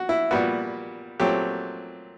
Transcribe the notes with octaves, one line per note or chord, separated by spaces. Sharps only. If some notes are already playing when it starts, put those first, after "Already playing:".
Already playing: F#4
E4
A#2 G3 B3 F#4
A#2 F#3 A3 C4 G4